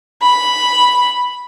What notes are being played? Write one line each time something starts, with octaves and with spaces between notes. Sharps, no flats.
B5